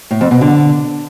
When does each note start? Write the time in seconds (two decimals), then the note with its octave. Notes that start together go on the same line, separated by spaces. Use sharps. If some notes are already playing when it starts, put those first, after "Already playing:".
0.11 A2
0.21 F2
0.31 B2
0.41 D3